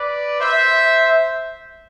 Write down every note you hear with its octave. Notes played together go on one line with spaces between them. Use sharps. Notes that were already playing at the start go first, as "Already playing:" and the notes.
Already playing: B4 D5
C5 E5